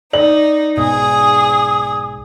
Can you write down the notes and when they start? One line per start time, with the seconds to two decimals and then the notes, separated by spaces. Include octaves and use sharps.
0.13 D#4 D5 F#7
0.77 B1 G#2 B2 G#4 D#6